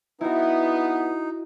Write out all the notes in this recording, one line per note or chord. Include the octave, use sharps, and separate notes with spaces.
B3 D#4 E4 F#4